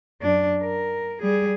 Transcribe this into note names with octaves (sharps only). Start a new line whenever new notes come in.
F#2 D4
A#4
G3 G#4